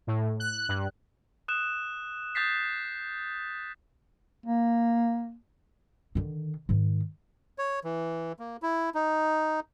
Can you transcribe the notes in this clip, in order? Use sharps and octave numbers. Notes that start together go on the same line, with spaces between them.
A2
F#6
G2
D#6 F#6 E7
D#6 G6 A6 B6 C7
A#3
D3 D#3
G#2 D#3
C#5
E3
A#3
E4
D#4